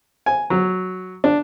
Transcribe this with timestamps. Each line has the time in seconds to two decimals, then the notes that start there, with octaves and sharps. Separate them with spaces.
0.26 G#5
0.50 F#3
1.24 D4